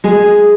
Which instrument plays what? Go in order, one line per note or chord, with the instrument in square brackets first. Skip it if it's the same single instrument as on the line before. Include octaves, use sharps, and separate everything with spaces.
[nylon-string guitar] G#3 G#4